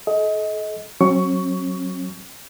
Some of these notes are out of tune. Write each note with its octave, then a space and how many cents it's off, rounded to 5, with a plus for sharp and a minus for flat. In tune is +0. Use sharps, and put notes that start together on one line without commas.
A4 -40 D#5 +25
F#3 +0 C#4 -45 C#6 +15